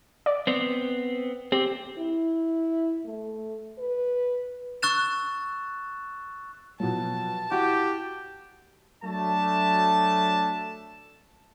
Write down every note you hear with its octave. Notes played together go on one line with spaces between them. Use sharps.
D5
B3 C4
C4 G4
E4
A3
B4
C#6 E6 F#6 A6 E7
B2 F3 F#3 A5
E4 F#4 G4
F#3 A3 D4 A5